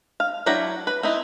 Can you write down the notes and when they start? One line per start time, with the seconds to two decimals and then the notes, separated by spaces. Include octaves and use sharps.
0.20 F5
0.46 F#3 D4 E4 G5 A#5
0.87 B4
1.03 C4 D#4 E4